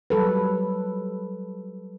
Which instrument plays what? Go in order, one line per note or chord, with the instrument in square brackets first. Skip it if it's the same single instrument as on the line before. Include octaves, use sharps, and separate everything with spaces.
[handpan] F#3 G3 A4 B4